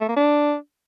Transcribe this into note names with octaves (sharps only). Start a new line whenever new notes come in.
A3
A#3
D4